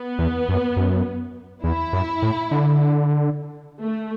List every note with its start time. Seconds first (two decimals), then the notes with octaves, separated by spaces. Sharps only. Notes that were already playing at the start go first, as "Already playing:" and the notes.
Already playing: B3
0.19 E2
0.49 F#2
0.76 F#2
1.64 E2 E4
1.93 F#2
2.22 A2
2.51 D3
3.82 A3